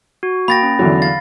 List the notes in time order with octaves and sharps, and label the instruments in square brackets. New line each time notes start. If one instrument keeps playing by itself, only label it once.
[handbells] F#4
[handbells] A#3 G5 [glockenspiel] B5 A6 A#6
[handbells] C#4
[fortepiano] E2 D3 F#3
[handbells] F5 [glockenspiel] A6